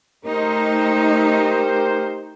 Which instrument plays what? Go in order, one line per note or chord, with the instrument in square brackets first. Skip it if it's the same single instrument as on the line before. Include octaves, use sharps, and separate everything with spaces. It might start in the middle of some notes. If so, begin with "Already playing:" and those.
[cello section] A3 D#4 [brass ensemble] G4 A#4 C5